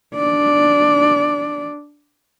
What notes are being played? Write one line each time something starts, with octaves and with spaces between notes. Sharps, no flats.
D4 D5